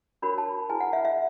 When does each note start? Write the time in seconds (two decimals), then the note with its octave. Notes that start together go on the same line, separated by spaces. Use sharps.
0.22 D4 F#4 A#4 C#5 B5
0.38 A5
0.69 E4 G#4 B4 G#5
0.80 F#5
0.93 E5
1.05 E5